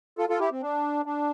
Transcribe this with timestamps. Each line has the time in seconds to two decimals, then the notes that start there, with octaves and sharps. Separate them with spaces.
0.18 F4 A4
0.29 F4 A4
0.40 E4 G4
0.52 C4
0.62 D4
1.05 D4